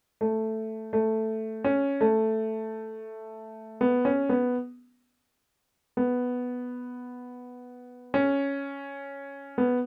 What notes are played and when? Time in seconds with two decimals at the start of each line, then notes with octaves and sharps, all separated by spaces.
0.21 A3
0.93 A3
1.64 C#4
2.01 A3
3.81 B3
4.05 C#4
4.29 B3
5.97 B3
8.14 C#4
9.58 B3